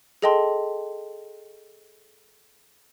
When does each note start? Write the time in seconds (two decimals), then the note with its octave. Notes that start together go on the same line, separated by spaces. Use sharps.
0.22 G#4 A4 D#5 G5 A5 C6